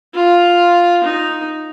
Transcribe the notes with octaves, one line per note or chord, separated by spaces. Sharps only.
F4
D#4